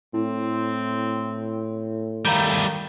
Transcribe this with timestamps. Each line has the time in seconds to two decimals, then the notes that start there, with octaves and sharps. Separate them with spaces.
0.14 A2 C4 E4
2.25 D#3 G3 A3 F5 A#5 G6